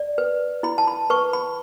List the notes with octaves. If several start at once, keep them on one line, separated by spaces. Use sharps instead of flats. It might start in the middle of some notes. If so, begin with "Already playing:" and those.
Already playing: D5
B4
E4 B5
A5
B5
B4 C#6
B5